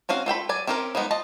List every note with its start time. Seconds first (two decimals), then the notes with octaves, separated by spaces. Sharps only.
0.09 C4 C#4 F#4 F5
0.26 F4 A4 G5 B5
0.49 F#3 D5 G#5
0.67 C4 C#4 D#4 G4 A#4
0.95 F3 G3 G#3 B3 D#4
1.11 F4 D#5 A5